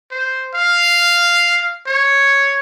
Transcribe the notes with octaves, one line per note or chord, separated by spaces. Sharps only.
C5
F5
C#5